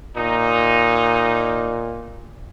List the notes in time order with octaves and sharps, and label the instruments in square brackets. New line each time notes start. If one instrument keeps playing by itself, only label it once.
[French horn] A#2 [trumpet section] D#4